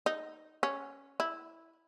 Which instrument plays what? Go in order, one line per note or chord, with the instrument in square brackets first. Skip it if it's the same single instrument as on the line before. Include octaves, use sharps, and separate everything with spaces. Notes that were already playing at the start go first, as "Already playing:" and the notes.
[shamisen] D#4
C#4
E4